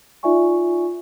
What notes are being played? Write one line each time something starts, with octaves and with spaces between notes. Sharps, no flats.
D#4 F4 D5 E5 G#5 C#6